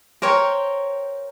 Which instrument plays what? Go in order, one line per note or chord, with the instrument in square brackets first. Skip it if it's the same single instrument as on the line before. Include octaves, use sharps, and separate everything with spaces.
[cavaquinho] A#4 C5 C#5 G5